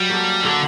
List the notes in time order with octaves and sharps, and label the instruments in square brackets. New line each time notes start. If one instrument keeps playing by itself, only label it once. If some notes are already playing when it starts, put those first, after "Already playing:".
Already playing: [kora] F#3 [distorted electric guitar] G3
[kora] A#3 F#4 A4
[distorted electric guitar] D3 [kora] A#3 F#4 A4